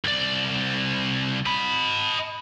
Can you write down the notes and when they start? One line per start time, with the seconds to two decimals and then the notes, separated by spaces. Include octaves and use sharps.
0.05 C2 D5
1.46 D#5 B5